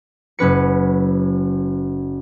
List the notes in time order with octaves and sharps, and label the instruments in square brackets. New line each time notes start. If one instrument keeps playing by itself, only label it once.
[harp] F#1 C#4 B4 C#7